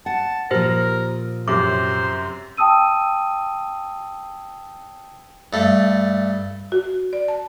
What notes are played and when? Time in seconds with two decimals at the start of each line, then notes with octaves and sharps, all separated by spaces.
0.06 F#5 A5
0.51 A#2 F3 G4 A#4 C5 A#6
1.48 F#2 C3 C5 D6
2.57 G5 A5 D#6 E6 D#7
5.53 G2 A3
6.72 F#4
7.13 D5
7.28 A5